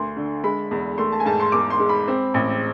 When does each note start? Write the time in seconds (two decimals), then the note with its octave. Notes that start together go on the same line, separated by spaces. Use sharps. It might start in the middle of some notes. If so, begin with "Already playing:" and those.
Already playing: D2 C6
0.16 D3
0.44 G#3 B5
0.71 E2
0.98 A3 C6
1.12 A5
1.20 G#5
1.26 G#2 A5
1.40 C6
1.52 E2 D6
1.70 C6
1.80 G#3
1.89 B5
2.08 C4
2.34 A1